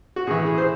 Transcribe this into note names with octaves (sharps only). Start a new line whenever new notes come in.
F#4
A2 E3 G#4
G#4
C5